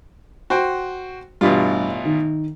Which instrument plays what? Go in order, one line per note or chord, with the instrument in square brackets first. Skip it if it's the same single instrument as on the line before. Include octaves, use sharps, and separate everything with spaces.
[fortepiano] F#4 C5 G5
[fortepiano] A1 B2 F4 [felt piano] G2
[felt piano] D#3